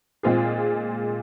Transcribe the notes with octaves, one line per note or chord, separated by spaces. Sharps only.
A#2 G#3 C4 F4 G#4